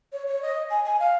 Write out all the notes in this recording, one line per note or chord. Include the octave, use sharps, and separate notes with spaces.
C#5
C#5
D#5
G#5
G#5
F5